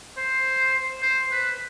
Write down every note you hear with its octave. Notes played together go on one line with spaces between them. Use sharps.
C5
C5
B4